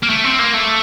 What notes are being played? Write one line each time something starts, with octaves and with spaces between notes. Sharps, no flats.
A#3
A3
C4
A#3
A3